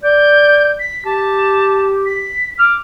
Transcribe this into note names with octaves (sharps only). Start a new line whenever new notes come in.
D5 G6
B6
G4 A5
B6
D6 F6